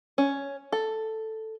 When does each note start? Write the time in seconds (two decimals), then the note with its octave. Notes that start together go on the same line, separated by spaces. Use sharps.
0.18 C#4
0.72 A4